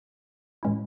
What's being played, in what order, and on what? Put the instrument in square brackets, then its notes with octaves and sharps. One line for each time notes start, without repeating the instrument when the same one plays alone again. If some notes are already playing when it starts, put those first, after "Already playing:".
[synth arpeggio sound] A2 E3 G#3 C#4 E4